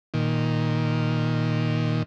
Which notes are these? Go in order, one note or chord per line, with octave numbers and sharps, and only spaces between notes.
A#2 D#3